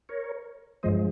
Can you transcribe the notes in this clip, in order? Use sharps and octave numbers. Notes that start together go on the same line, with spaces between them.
A#4 C#5
G2 F3 G#3 C5 D#5